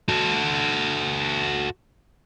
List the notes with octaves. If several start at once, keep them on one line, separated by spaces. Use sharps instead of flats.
F#4 A4